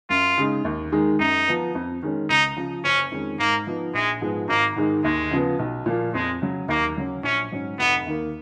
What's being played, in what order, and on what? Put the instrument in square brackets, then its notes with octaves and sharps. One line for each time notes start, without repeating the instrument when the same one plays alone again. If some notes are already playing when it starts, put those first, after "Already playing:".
[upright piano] F#2 [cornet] F4
[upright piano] C#3 G#3 D#4
D#2
D#3 G#3 D#4
[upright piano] F#2 [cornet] D#4
[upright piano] F3 B3
F2
D#3 G#3 C#4
[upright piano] C#2 [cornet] D#4
[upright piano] C#3 F3
[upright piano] F#1 [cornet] C#4
[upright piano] F2 D#3 G#3 C#4
[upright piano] G#2 [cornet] A#3
[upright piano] F3 B3 D#4
[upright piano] A#1 [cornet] G#3
[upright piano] G#2 F3 G#3 B3
[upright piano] G#1 [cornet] A#3
[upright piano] G#2 D#3 G#3 D#4
[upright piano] D#2 [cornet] G#3
[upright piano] C#3 F3 B3
B1
A#2 F3 A#3
[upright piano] F2 [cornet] G#3
[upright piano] C#3 F#3
[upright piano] D#2 [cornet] A#3
[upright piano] C#3 F#3 C#4
[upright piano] A#1 [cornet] C#4
[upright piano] G#2 F#3 C#4
[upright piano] F1 [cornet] B3
[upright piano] D#2 D#3 A#3